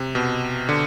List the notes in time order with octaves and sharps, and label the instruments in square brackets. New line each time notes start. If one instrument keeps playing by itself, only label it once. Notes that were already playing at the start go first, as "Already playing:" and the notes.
Already playing: [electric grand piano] C3
B2
D3